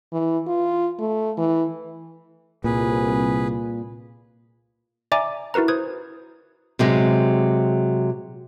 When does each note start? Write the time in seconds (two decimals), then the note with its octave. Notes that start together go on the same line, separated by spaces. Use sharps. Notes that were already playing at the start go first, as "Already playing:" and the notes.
0.13 E3
0.47 F4
0.99 A3
1.38 E3
2.64 C2 A#2 G#4 B4
5.12 D5 E5 G#5 A#5 D6
5.54 E4 F#4 A#4 B4 A#5
5.68 B4 C5 D#6 G#6
6.79 C3 F#3 G#3